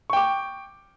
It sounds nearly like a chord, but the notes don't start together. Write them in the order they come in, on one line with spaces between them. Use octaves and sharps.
C#6 G5 D6